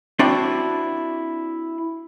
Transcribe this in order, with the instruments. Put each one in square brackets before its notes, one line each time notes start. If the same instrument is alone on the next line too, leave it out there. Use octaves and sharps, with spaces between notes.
[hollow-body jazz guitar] C4 D4 E4 F#4 C5 D5